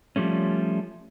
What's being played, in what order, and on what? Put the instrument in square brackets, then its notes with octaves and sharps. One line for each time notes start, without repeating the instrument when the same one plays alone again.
[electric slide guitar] F3 G3 A3 C#4